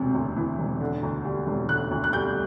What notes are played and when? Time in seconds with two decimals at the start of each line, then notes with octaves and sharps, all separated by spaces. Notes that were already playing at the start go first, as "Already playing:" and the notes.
Already playing: E1 D2 C3
0.14 D2
0.36 E3
0.59 E1
0.80 D3
1.03 D2
1.25 G3
1.47 E1
1.69 D3 F#6
1.91 D2
2.04 F#6
2.13 G3 G6